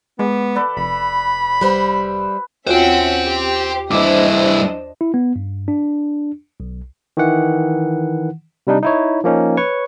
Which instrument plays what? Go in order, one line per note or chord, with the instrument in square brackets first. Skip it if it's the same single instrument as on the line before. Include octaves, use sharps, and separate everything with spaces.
[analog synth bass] G#3 [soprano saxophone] B3 [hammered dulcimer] D6
[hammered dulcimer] A4 B4 D5
[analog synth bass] F1 [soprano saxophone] B5
[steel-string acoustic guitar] G3 C5 E5 [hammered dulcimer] B4
[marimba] D#2 F4 F#4 [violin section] C#4 E5 F#5 [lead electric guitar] C5 G5
[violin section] G4
[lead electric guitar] G2 E4 [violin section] D4 C5 D#5 [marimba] D6
[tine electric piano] E4
B3
G2
D4
B1
D#3 E3 F#5
C3 G3 D4 D#4
D#4 E4 C#5
F3 A#3 C#4 D#4
B4 C#5 C#6